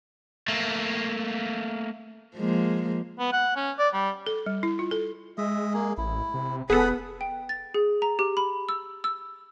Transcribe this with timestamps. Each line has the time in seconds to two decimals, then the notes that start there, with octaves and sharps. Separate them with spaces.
0.48 A3 A#3
2.36 F3 G#3 A#3
3.19 B3
3.33 F#5
3.56 C#4
3.78 D5
3.94 G3
4.26 A4
4.46 G3
4.63 E4
4.79 F4
4.91 A4
5.38 G#3 D#5 E5
5.73 A#3 G#4
5.98 A1 E4
6.34 C3
6.70 E1 B3 G#4 A4 F#5 B5 D#6
7.21 G5
7.49 A6
7.74 G#4
8.02 A#5
8.19 G4
8.37 B5
8.69 E6
9.04 E6